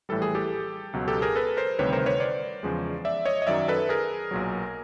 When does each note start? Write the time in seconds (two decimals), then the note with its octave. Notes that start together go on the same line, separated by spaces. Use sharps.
0.09 A#1 A2 E3 G3 A4
0.22 G#4
0.35 G4 A4
0.93 C#2 B2 F#3
1.08 G4 A4
1.22 G#4 A#4
1.36 A4 B4
1.57 A#4 C5
1.79 D2 C3 D#3 G3 B4 C#5
1.93 A#4 C5
2.06 B4 C#5
2.20 C5 D5
2.63 E2 C#3 F3 G#3
3.05 D5 E5
3.25 C#5 D#5
3.42 D#5
3.47 F#2 D#3 F#3 D5 E5
3.68 A4 B4
3.89 G#4 A#4
4.31 B1 A#2 F#3